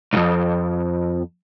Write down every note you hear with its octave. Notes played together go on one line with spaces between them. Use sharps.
C2 F2